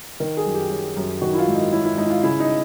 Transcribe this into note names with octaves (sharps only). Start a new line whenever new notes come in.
D#3 A#4
G#4
F#2
G4
F#3
F#2
D#3 F#4
E4
F4
G#2
D#4
F#3 E4
E4
G#2 D#4
E4
F4
C#3 E4
D#4